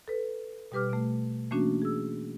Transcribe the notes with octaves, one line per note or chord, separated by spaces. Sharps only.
A4 B4
B2 G3 G4 B4 D6 F6
B2 A3
E3 A3 A#3 C#4 D4 F#4
G#4 E6